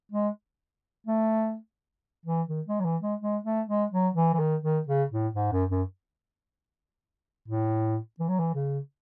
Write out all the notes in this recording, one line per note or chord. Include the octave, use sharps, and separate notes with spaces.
G#3
A3
E3
D#3
G#3
F#3
E3
G#3
G#3
A3
G#3
F#3
E3
E3
D#3
D#3
C#3
A2
G#2
F#2
F#2
A2
E3
F#3
E3
C#3